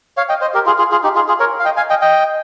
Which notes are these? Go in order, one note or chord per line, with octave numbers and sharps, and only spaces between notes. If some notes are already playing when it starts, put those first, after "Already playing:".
C#5 F5
D#5 G5
C5 D#5
G4 A#4
F4 G#4
F4 G#4
F4 G#4
D#4 G4
F4 G#4
F4 G#4
A#4 C#5
F5
D#5 G5
F5 G#5
D#5 G5
D#5 G5